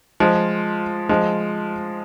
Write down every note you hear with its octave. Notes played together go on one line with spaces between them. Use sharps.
F3 G#3
F3 G#3